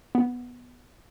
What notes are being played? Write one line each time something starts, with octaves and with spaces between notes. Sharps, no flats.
B3